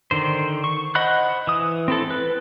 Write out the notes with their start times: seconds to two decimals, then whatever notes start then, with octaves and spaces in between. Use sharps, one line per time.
0.11 D3 D#3 C5
0.64 C#6
0.95 C5 D#5 F#5 B5 F#6
1.47 E3 D#6
1.88 C4 E4 A4
2.11 B4